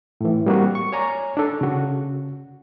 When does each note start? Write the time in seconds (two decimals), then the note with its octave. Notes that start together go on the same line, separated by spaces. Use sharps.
0.21 A2 E3
0.46 G3 A#3 C4 F#4
0.75 C#6
0.92 C#5 D5 G#5 A#5
1.37 D4 A4
1.61 C#3 F#4